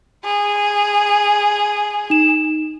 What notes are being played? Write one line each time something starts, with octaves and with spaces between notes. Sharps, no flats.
G#4
D#4 E7